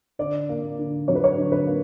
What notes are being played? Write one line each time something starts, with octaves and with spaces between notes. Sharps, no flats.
D3 D5
A#3
D3
F#3 C#5
B4
C#5
D3
B4
A#3